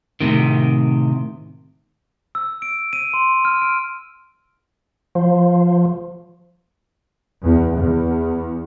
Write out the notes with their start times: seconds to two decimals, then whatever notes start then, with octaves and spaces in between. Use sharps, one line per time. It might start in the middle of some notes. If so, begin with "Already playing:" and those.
0.21 A2 C3 D#3
2.35 E6
2.62 D7
2.93 D#7
3.14 C6
3.45 F6
3.62 D7
5.15 F3
7.42 E2
7.74 E2